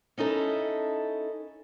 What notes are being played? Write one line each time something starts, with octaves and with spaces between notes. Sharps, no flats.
C#4 D#4 E4 A4